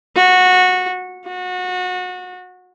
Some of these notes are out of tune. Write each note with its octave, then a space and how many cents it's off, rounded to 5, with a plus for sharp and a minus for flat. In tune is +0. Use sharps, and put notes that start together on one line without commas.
F#4 -15
F#4 -25